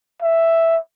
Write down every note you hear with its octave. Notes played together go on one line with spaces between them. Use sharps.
E5